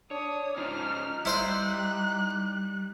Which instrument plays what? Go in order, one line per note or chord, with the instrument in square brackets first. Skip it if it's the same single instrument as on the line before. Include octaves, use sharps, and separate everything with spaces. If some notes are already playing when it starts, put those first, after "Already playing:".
[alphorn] D4 [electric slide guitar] C#5 [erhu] D#6
[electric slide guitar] C#4 F4 C5 [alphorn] D#4 [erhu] F6
[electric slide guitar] G3 [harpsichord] E4 C5 F5 [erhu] F#6